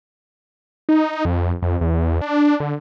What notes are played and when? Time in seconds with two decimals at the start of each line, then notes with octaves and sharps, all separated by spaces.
0.89 D#4
1.25 F2
1.62 F2
1.81 E2
2.21 D4
2.60 D3